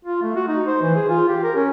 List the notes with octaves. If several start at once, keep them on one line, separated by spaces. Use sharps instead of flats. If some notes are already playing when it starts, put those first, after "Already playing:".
F4
A3
F#4
D#4
C5
E3
G#4
F4
G4
A#4
C#4